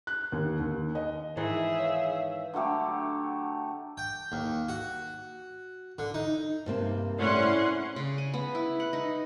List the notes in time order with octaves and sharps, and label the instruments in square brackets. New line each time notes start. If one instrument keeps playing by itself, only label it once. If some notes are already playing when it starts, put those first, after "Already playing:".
[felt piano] F#6
D#2
D#2
D#5
[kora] G#2 D#3 E3 [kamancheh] G#4 E5
[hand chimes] B4 C#5 F5
[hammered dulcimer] D3 F#3 A3 G4
[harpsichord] G5
D#2
F#4
D3
D#4
[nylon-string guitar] G2 C3 A#3
[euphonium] A2 [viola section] C#4 F#5 C6 [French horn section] E4 D5
[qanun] C#3
G#5
B3
E4
F#5
D#4